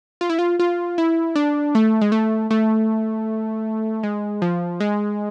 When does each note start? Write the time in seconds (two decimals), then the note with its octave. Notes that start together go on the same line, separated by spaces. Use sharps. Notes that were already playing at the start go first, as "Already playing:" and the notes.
0.21 F4
0.30 E4
0.39 F4
0.59 F4
0.98 E4
1.36 D4
1.75 A3
2.01 G#3
2.12 A3
2.51 A3
4.03 G#3
4.42 F3
4.80 G#3